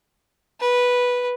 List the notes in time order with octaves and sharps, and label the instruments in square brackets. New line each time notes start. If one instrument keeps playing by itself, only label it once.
[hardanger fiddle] B4